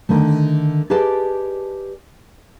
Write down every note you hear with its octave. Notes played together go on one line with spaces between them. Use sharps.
D3 D#3 A3
G4 G#4 B4 D5 D#5 A5